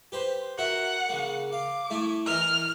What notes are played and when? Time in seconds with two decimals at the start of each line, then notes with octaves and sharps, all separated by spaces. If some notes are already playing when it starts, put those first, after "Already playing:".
0.12 G4 B4 C5
0.58 F#4 A#4 E5 F#5
1.09 C#3 A#3
1.53 F5 D6
1.90 A3 E4 G#5
2.26 E3 A#4 D#5 F6